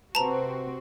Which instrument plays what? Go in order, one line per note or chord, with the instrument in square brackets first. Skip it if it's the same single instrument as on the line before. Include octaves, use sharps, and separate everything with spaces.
[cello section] C3 C4 F#4 [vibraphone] B4 C5 [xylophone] A5 A#5